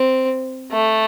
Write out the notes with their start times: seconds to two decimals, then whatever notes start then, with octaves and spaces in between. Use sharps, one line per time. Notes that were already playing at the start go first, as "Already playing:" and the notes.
Already playing: C4
0.72 A3